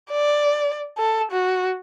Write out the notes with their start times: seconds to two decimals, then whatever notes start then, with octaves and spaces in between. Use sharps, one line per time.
0.12 D5
0.98 A4
1.32 F#4